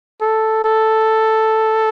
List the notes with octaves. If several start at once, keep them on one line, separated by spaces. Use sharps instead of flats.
A4
A4